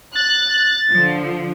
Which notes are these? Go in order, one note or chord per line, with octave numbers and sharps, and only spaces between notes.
F#6 A6
D3 F3